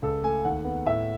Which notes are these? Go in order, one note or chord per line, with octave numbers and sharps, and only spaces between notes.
C#2 A4
A3 G#5
D#2 F#5
B3
A2 E5